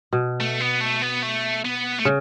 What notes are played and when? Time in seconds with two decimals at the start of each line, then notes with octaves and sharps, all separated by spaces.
0.13 B2
0.40 A3
0.61 B3
0.81 A3
1.02 B3
1.23 A3
1.65 B3
1.99 A3
2.05 C#3